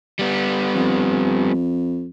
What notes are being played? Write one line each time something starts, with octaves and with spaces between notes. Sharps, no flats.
G3 B3
F2